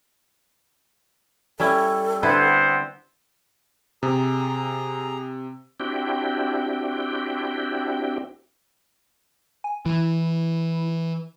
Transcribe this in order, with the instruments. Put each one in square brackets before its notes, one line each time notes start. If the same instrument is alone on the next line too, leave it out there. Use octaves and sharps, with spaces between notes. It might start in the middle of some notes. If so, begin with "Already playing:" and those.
[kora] G3 C#4 E4 [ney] A4
[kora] D3 E4 B4 [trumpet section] B3 C4 C5
[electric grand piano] C3 [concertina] G#4 A#5
[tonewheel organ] C4 D4 E4 F#4 G4 G5
[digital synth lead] G#5
[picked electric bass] E3 [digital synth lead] E4